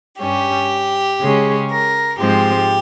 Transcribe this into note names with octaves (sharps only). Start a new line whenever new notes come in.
G2 G3 C#4 G4
C#3 G#3 C#4
A#4
G#2 F3 G#3 C4 G4